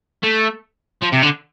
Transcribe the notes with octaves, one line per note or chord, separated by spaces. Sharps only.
A3
F3
C3
D3